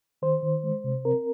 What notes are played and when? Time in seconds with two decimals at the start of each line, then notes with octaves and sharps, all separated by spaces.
0.22 D#3 C5
0.42 D#3
0.63 G#3
0.84 C3
1.05 C4 A#4